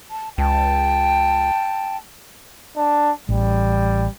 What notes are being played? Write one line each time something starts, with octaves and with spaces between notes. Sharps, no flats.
A5
C#2 G5 A5
D4
A1 G3